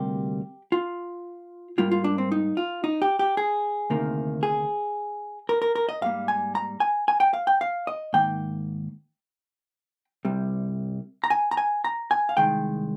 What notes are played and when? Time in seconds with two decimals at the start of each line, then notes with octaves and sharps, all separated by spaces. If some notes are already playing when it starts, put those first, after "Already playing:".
Already playing: D2 C3 G3 A#3 G4
0.72 F4
1.78 G#2 G3 A#3 F4
1.91 F4
2.04 D4
2.18 C4
2.32 D#4
2.57 F4
2.84 D#4
3.02 G4
3.19 G4
3.37 G#4
3.90 D2 C3 D#3 A#3
4.43 G#4
5.49 A#4
5.62 A#4
5.75 A#4
5.89 D#5
6.01 G#2 G3 A#3 F5
6.28 G#5
6.55 A#5
6.80 G#5
7.08 G#5
7.20 G5
7.34 F5
7.47 G5
7.61 F5
7.87 D#5
8.13 G#2 D#3 A#3 G5
10.25 C2 C3 G3
11.24 A#5
11.30 G#5
11.51 A#5
11.57 G#5
11.84 A#5
12.11 G#5
12.29 F5
12.37 C2 C3 D#3 G#3 G5